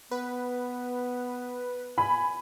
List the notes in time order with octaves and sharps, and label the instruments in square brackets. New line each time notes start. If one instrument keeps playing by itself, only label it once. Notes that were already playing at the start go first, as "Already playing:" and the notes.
[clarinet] B3 [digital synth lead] B4
[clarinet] G#5 [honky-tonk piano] B5